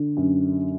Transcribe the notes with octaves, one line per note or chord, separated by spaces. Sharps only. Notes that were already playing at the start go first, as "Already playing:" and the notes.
Already playing: D3
F#2